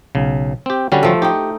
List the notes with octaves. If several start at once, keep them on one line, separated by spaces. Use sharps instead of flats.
B1 C#3
C4 G4
D3 G3 C#4 F#4
F3 A3
D#4 G4 G5